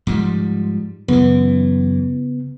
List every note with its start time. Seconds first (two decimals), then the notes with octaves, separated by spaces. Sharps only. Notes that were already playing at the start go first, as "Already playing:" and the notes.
0.07 G#2 F3 G3
1.08 F#2 C#3 E3 B3